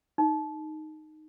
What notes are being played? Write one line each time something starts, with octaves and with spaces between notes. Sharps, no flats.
D#4